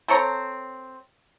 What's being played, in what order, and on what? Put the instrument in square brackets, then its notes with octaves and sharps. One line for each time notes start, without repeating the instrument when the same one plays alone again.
[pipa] C4 A4 C#5 A#5